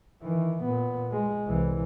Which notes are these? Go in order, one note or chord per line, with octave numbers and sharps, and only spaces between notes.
D#3 E3
A#2 B3
G#3
C2 E3